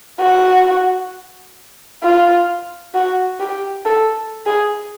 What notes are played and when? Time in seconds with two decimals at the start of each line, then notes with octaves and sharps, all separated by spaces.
0.20 F#4
2.03 F4
2.94 F#4
3.40 G4
3.85 A4
4.46 G#4